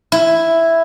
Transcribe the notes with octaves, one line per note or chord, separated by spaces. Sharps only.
E4